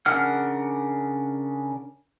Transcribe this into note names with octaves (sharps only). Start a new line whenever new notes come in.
C#3 D4 A#4 F#5 F6